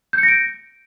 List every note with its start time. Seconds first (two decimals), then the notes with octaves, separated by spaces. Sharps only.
0.13 G6
0.18 C#7
0.23 A#6
0.28 D7